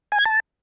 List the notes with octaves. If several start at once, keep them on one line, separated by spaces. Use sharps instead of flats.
G#5
G#6
A5